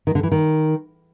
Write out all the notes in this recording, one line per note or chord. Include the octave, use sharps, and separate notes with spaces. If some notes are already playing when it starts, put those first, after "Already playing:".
D#3
D3
E3
D#3